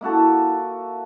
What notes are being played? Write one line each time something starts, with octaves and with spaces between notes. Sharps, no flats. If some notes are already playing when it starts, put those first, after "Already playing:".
A#3 E4 F#4 A4